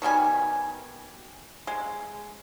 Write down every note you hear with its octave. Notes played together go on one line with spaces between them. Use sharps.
B2 D#3 G3 G#5
G#3